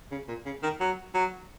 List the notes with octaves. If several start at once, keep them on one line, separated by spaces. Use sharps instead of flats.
C#3
A#2
C#3
D#3
F#3
F#3